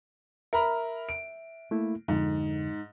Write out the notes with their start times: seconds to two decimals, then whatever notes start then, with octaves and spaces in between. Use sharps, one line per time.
0.53 A#4 E5 A#5 B5
1.09 D7
1.71 A3 A#3 E4
2.08 F2 G#2 D3